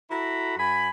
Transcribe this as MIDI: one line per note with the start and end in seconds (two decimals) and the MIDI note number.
0.11 0.55 64
0.11 0.55 66
0.11 0.55 69
0.11 0.55 82
0.11 0.55 83
0.58 0.89 42
0.58 0.89 80
0.58 0.89 83